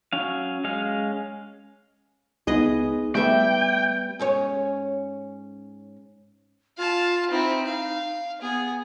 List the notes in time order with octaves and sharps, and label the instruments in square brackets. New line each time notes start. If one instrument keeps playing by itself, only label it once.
[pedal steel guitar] F#3 C#4 F5
G#3 C#4 F5
[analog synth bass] C#2 [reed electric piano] B3 D#4 [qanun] G#4 B4 D#5
[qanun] G3 E5 [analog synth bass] A3 [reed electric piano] B3 B4 [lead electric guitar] G5
[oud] G#2 C#4 C#5
[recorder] F4 [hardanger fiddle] F5 A5
[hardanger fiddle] C4 E4 [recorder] D#4
[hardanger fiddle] F5
[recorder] B3 [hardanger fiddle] G#4